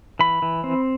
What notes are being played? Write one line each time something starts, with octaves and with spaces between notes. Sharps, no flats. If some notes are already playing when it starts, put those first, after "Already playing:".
E3 B5
E3
C4